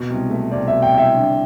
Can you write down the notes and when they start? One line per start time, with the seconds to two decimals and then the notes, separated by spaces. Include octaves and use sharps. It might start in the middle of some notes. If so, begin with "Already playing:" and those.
Already playing: B2
0.10 C2
0.30 A3
0.51 C2 D5
0.68 E5
0.72 B2
0.82 G5
0.93 C2 E5
1.14 D3